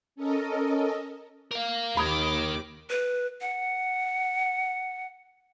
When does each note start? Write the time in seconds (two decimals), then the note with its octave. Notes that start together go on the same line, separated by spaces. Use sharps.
0.16 C#4 A4 A#4 D#5
1.51 A#4 F5
1.97 D#2 D#3 A#4 B5 D6 D#6 G#6
2.90 B4
3.41 F#5